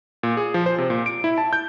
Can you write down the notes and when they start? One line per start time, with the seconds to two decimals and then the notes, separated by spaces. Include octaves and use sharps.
0.23 A#2
0.37 G#4
0.54 F3
0.66 C5
0.78 C3
0.90 A#2
1.06 D7
1.24 E4
1.38 A5
1.53 G6